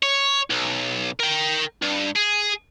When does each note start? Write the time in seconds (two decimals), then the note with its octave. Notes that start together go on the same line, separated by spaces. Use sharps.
0.03 C#5
0.50 B1
1.20 A#4 G5
1.82 G2
2.16 G#4